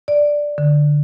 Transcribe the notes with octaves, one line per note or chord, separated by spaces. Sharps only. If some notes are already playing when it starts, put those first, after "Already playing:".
D5
D3